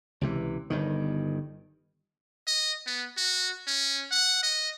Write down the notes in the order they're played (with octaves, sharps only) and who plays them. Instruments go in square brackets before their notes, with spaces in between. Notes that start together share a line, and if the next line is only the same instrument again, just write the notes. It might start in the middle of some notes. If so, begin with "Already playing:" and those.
[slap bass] C#2 C3 E3
G1 G2 D#3
[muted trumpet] D#5
B3
F#4
C#4
F#5
D#5